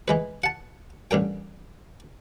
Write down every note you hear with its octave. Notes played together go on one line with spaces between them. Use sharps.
E3 G#3 B4
F#5 A5
A1 G2 A#4 G5